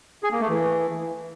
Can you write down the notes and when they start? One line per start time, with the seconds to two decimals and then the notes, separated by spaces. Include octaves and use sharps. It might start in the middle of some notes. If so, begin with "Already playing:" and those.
0.23 G#4
0.32 A#3
0.41 A3
0.49 E3